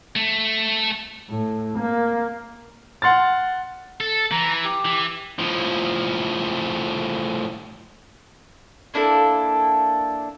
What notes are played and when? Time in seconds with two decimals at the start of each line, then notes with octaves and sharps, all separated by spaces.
0.16 A3
1.30 A2
1.78 A#3
3.02 F#5 C6 F6 A6
4.01 A4
4.32 E3 A#5
4.64 G4
4.85 E3
5.39 A2 F3
8.94 A#3 D4 E4 A4